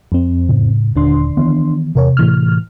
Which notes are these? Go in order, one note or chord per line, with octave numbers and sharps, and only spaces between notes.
F2 C4
A2 C#3
D#1 D3 D4 C6
D#3 E3 B3
E2 C3 A#4 C#5
A2 E3 F6